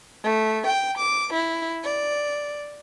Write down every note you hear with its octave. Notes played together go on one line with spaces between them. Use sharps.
A3
G5
D6
E4
D5